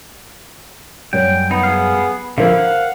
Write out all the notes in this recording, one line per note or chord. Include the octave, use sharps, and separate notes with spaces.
F#2 G3 G5
B3 D#4
G#4 F5
D3 F3 E4 A#4 C5 E5 F5
F#5